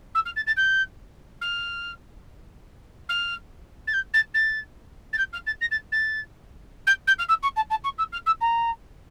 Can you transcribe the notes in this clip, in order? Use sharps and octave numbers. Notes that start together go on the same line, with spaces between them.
E6
F6
A6
A6
G6
F6
F6
A6
G6
A6
A6
A6
G6
F6
A6
A#6
A6
A6
G6
G6
F6
E6
C#6
A5
A5
C#6
E6
F6
E6
A#5